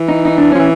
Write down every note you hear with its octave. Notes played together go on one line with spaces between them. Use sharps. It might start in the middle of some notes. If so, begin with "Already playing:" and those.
Already playing: E3
D#4
D#4
D4
F3 C#4
E3